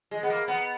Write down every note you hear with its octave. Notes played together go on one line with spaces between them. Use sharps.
G#3
B3
A#3
B3